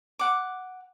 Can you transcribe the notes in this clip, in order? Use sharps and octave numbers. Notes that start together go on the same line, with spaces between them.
F#5 D6